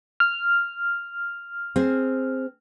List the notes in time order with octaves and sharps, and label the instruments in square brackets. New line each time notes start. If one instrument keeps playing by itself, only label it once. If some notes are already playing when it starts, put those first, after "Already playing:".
[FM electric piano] F6
[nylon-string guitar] C4 G#4